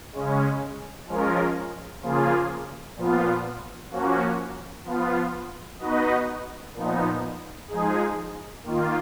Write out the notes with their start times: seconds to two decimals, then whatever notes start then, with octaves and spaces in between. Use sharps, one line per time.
0.12 C#3 G#3 C#4
1.06 F3 G#3 C#4 F4 A#4
2.01 C#3 F3 A#3 F4 G#4
2.96 A#2 F3 B3 F4
3.90 F3 A#3 C#4 F#4
4.85 F3 B3 F4
5.79 B3 D#4 F#4 B4 D#5
6.73 A#2 F3 B3 D#4
7.68 F3 G#3 D#4 G#4
8.63 D#3 A#3 F4